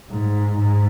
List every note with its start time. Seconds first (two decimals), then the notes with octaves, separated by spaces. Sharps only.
0.11 G#2
0.58 G#2